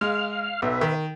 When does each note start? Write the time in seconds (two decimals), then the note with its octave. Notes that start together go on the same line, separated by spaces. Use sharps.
0.01 G#3 F5 F6
0.62 B1 B4 E5
0.81 D#3